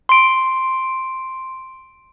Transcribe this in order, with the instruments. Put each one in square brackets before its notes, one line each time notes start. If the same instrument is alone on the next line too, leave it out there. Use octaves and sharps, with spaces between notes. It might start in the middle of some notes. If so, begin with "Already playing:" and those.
[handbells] C6 D7